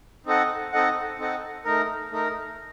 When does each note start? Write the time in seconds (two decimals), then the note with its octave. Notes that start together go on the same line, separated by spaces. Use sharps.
0.26 C4 D#4 A4 D#5 F#5
0.72 C4 D#4 A4 D#5 F#5
1.19 C4 D#4 A4 D#5 F#5
1.65 A3 D#4 A#4
2.11 A3 D#4 A#4